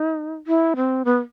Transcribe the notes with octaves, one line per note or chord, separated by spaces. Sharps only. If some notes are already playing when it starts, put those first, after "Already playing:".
Already playing: D#4
E4
C4
B3